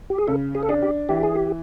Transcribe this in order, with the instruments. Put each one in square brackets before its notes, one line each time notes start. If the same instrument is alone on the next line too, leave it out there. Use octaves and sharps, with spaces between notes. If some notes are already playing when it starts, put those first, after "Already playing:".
[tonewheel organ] G4
G#4
[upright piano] C#3 [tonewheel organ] A4
[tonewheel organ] G#4
A4
[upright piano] D4 [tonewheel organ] G#4
[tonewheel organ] G4
[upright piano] E3 [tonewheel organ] G4
[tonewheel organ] G#4
G4